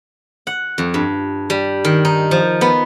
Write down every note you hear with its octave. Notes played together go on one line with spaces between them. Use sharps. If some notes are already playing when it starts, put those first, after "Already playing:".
F#5
F2
G2
G3
D#3
D#4
F3
B3